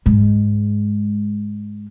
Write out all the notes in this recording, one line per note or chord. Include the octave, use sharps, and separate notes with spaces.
G#2 G#3